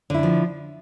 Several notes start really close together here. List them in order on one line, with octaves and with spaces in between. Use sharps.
D3 E4 D4 F3